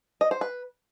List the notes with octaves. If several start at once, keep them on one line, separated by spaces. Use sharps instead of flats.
D#5
C5
B4